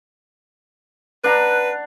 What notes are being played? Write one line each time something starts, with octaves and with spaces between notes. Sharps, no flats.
D4 B4 F#5 A#5